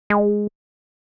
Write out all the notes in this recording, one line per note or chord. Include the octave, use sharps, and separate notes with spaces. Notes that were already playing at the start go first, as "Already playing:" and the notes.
G#3